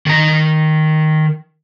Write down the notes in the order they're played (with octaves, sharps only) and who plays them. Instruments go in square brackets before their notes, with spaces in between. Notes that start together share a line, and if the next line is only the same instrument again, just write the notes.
[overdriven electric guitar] D#3 A#5